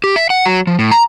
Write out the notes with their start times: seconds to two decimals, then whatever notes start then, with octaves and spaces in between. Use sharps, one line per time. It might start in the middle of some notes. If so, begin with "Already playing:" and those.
0.04 G4
0.16 E5
0.30 F#5
0.46 F#3
0.67 F3
0.79 A2
0.91 A#5